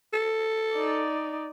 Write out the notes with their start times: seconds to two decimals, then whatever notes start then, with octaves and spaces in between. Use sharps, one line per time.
0.13 A4
0.74 D#4 D5